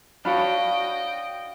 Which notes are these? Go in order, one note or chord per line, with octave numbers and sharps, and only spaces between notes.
D4 F#4 C#5 D#5 F5 G5 B5